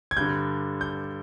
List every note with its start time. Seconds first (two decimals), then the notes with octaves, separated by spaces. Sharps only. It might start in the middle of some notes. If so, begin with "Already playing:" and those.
0.11 G#6
0.17 G2 D3 G6
0.81 G6